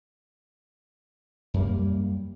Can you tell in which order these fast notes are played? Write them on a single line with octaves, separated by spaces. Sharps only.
F#2 G3 A#3